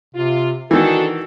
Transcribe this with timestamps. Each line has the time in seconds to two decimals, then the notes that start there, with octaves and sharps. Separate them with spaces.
0.15 C3 F4
0.71 D#3 E3 D4 D#4 F#4 A4